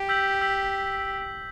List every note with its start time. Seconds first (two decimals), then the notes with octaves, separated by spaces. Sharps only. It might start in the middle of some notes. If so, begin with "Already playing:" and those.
Already playing: G4
0.09 E6 G6 B6 F#7
0.41 E6 G6 B6 F#7